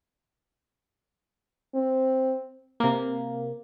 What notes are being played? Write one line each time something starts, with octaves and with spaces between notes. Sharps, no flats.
C4
C3 A#3